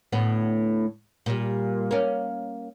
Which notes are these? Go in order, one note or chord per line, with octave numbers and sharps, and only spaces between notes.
D2 A2 B3
A#2 G3
A#3 C#4